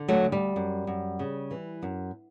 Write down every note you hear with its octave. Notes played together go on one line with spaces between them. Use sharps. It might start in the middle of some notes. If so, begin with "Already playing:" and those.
Already playing: D3
F#3 A3
D2
G3
F#2
F#2
C#3
E3
F#2